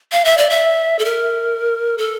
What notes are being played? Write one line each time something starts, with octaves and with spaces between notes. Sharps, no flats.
F5
E5
D5
E5
A4
A#4
A4